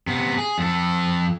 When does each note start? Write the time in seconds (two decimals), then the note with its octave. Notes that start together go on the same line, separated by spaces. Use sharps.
0.07 C3 B3
0.38 G#4
0.58 F2 A4